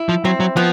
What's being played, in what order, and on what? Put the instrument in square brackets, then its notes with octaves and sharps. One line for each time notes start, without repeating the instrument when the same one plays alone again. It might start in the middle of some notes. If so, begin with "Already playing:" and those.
Already playing: [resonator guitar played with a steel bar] E4
[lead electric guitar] F3
[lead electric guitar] F#3 [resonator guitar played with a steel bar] C4
[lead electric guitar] F#3
[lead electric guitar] F3 [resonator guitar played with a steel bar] B3